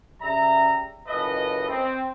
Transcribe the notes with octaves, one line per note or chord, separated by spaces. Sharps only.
C#3 G3 E5 A#5
F#1 C#2 A4 B4 D#5
C4